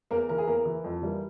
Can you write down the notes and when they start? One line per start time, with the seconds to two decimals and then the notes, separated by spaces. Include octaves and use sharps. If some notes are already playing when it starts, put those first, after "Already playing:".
0.11 E2 A#3 A#4
0.28 E3 A#3 A#4
0.38 G#4
0.47 E2 A#3 A#4
0.66 E3 A#3
0.84 F2
1.02 E3 G3 A#3